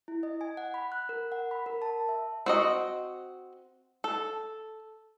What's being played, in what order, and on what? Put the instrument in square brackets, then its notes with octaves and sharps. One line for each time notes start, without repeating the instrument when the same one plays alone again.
[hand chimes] E4
D#5
G#5
F#5
B5
F#6
A#4
F#5
B5
A#4
A5
E5
[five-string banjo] C4 F#4 D#5
A4